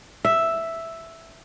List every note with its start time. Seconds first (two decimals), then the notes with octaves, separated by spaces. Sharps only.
0.25 E5